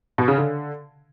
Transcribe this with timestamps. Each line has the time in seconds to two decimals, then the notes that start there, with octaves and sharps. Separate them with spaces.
0.18 B2
0.28 C#3
0.38 D3